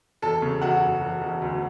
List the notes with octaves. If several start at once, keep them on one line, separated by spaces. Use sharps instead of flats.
E1 A4 A5
C#3
E1 F#4 F#5
E1
E1
E1
D2